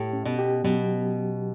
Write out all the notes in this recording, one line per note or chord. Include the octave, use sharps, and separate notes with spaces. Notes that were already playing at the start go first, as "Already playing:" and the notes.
Already playing: A2 G4
C#4
B2
G4
B2 F#3